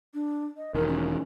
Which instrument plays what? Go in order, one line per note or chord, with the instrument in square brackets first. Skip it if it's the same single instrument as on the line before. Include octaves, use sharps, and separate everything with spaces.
[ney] D4
D#5
[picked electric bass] E1 D#3 [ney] A#4
[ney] C#4